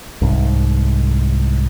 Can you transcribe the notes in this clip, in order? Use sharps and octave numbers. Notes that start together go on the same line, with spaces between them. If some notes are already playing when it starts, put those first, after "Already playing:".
C2 G#2